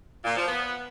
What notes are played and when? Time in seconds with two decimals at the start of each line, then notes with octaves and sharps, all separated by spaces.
0.24 A#2
0.36 F3
0.47 B3